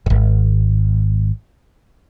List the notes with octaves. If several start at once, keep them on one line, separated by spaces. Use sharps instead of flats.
D1 G#1